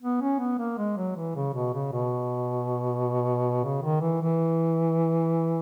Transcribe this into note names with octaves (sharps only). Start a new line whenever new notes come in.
B3
C#4
B3
A#3
G#3
F#3
E3
C#3
B2
C#3
B2
C#3
D#3
E3
E3